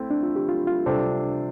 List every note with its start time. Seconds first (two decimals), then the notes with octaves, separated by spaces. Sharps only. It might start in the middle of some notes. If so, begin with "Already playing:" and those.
Already playing: A3 C4 E4
0.11 D4
0.23 F4
0.36 G4
0.48 F4
0.67 F4
0.86 C3 G3 D4 A4 C5